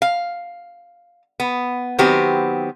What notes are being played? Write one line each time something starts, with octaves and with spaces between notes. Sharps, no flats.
F5
B3
D#3 F#3 B3 C4 G4 C5